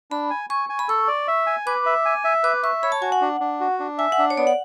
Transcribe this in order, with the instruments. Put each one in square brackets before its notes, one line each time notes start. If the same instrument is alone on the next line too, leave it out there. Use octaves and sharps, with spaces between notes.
[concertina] D4 [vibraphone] B5
[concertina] G#5
[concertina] G#5 [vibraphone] C#6
[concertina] G#5
[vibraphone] B5
[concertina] A4 [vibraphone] C#6
[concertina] D5
E5
G#5
[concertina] B4 [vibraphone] D6
[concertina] E5
G#5
E5
[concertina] B4 [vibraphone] D6
[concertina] E5 [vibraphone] C#6
[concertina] C#5 [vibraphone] B5
[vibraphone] A5
[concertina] F#4 [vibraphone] G#5
[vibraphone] F#5
[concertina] D4
D4
F#4
D4
[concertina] E5 [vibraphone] G#5
[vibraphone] F#5
[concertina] D4
[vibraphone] C#5
[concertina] B3 [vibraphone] D5
[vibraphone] F#5